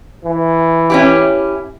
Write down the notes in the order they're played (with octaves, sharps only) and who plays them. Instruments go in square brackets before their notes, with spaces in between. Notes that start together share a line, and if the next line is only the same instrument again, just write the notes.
[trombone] E3
[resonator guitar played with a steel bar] C#4 E4 G4